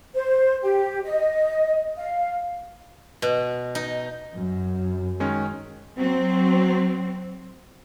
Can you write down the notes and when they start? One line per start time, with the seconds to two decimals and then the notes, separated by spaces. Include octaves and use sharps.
0.15 C5
0.63 G4
1.04 D#5
1.96 F5
3.22 B2
3.75 D#4
4.35 F#2
5.20 D#3 G#3 C#4
5.98 F#3 C4